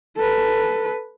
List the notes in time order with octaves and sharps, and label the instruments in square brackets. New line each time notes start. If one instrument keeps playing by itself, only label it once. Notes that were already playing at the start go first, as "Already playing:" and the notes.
[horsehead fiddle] A4 B4